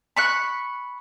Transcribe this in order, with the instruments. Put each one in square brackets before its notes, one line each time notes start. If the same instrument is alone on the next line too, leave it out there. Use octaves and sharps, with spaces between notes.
[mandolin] B5 C#6 F#6